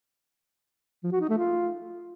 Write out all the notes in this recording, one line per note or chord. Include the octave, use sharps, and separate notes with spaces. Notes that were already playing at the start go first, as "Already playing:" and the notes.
F3
F#4
D#4
A3
F4